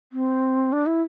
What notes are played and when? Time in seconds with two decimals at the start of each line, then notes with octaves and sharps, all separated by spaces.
0.13 C4
0.72 D4
0.86 E4